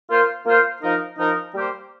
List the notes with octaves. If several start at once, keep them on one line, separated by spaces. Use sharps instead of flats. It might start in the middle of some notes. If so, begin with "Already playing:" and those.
A#3 F4 C5
A#3 F4 C5
F3 D#4 A#4
F3 D#4 A#4
G3 A#3 G4 C5